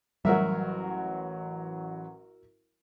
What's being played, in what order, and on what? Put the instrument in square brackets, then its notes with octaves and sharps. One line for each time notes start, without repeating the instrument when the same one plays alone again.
[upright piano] A1 F#3 [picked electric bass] G3 [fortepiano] F#4 A#4 E5